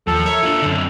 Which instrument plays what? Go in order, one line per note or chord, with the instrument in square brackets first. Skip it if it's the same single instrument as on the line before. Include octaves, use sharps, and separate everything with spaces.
[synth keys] D#2 [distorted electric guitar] F3 [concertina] A4
[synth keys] A#4 E5 [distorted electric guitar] C#5
[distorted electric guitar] D4 F4
[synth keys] F#2 D3 [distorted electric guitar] C4 D4